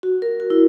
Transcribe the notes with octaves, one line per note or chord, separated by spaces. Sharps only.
F#4
A#4
F#4
E4